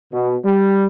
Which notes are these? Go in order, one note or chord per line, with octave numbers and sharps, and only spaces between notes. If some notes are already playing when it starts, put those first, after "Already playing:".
B2
G3